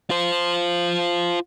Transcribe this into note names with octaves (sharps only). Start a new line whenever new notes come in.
F4 C5